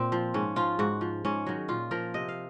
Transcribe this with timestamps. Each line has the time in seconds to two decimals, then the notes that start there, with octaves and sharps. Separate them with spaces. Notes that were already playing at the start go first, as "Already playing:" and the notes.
Already playing: A#2 C4
0.12 F3
0.34 G#2 C#4
0.56 F3 F4
0.79 G#2 F#4
1.01 F3
1.25 G#2 C#4
1.46 D#3 F#3
1.69 A#2 F4
1.91 F3 A#4
2.14 C3 D#5
2.28 F5